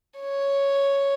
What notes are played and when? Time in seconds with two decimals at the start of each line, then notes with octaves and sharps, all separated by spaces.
0.19 C#5